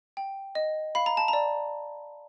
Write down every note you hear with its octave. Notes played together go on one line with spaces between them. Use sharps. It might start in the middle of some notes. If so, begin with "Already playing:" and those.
G5
D#5
F5 B5
A#5
A5
A#5
D5